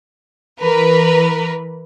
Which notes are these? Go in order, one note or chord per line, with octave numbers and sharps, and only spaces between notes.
E3 A#4 B4